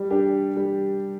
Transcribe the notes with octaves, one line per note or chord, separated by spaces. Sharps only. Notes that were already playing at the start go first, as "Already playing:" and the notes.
Already playing: G3
D4 G4
G3